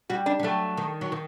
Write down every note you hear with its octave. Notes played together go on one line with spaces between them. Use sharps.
G3 F#4
D4
G3
F#3 A3
D#3
F#3
D#3